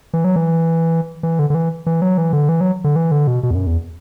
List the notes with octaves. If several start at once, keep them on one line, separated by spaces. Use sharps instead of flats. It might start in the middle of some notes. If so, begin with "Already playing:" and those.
E3
F#3
E3
E3
D3
D3
E3
E3
F#3
E3
D3
E3
F#3
D3
E3
D3
B2
B2
E2
F#2
E2